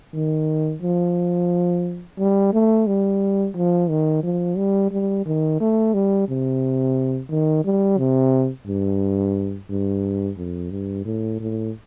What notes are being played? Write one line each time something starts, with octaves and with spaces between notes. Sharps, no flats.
D#3
F3
G3
A3
G3
F3
D#3
F3
G3
G3
D#3
A3
G3
C3
D#3
G3
C3
G2
G2
F2
G2
A2
A2